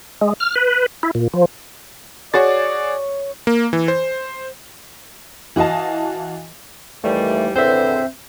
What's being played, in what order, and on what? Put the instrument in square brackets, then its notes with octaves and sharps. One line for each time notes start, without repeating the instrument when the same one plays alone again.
[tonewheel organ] G#3
F6
B4
E4
A#2
F3
[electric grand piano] F#4 G#4 A6 [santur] C#5 [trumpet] D5
[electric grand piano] A#3
E3
C5
[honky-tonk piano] E3 F#4 D#5 F5 A5
[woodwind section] D#2 E3 [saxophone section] G3 [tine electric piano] A3
[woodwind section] E2 A2 D3 [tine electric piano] C4 E5 [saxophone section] C5